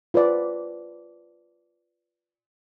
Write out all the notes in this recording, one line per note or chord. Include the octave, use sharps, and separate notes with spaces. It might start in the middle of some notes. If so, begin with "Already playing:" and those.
F4 B4 C5 D5